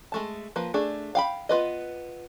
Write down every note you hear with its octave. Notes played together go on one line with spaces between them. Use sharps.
G#3 A3 A5
F3 A#3 B4
A3 D4 G#4
F5 G5 B5
B3 F4 B4 D#5